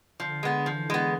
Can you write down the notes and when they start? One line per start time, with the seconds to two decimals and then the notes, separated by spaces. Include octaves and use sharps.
0.20 D3 F3
0.43 G#3 B3
0.66 E3 F3
0.90 G#3 B3